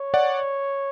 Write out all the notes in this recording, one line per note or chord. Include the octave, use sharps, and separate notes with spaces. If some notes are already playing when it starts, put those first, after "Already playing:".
Already playing: C#5
D5 F#5